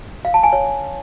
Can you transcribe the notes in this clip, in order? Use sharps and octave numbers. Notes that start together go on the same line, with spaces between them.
F5
A5
G#5
C#5